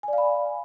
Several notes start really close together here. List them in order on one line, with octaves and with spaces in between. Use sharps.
G#5 D5 F5 B5